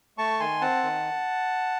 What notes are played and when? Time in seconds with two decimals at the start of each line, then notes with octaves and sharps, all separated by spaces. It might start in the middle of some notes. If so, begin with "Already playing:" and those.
0.18 A3 A5 C#6
0.40 D#3 G#5 C6
0.61 C4 F#5 A5
0.83 D#3